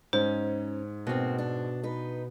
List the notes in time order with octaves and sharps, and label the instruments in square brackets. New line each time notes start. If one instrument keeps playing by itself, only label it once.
[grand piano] G#2 [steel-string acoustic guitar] C#4 [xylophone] C5
[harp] B2 [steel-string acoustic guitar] A#3 C4
[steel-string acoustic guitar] D4
D#4 B4